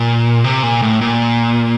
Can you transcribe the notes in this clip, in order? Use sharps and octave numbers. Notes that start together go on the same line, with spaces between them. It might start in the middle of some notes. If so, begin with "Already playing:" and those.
Already playing: A#2
C3
A#2
A2
A#2